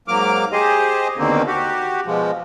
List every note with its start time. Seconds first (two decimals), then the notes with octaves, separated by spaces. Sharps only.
0.08 G#2 F#3 A#3 D6 F6
0.52 G4 G#4 C5 D#5
1.17 D#2 B2 D3 D#3 A#3 C4
1.47 F#4 G4
2.06 B2 F3 G#3